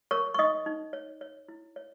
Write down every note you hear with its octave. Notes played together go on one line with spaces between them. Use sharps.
A#4 C#5 C#6
C#6
D#4 D#5 D#6
D#4
C#5
C#5
E4
C#5